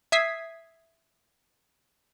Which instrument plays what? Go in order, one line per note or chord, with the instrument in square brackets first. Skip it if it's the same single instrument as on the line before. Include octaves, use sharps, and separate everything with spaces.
[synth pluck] E5 D#6 G#6 B6 C7